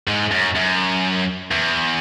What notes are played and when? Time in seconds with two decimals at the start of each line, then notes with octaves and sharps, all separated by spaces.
0.08 G#2
0.31 F#2
0.55 F#2
1.51 E2